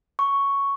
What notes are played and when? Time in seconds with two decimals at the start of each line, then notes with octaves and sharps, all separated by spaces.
0.19 C#6